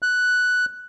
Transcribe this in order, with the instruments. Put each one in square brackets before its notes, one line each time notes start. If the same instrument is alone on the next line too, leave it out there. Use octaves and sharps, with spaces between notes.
[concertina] F#6